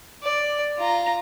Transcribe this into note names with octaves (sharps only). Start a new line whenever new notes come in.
D5
F4 A#5